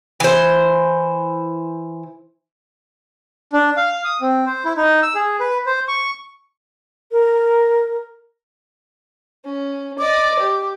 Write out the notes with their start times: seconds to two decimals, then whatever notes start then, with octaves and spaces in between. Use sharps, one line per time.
0.20 E3 C5
3.53 D4
3.77 F5
4.05 D#6
4.21 C4
4.46 C5
4.65 E4
4.77 D#4
5.03 E6
5.15 G#4
5.40 B4
5.66 C5
5.88 C#6
7.12 A#4
9.45 C#4
9.99 D5 D#5 D6
10.39 G4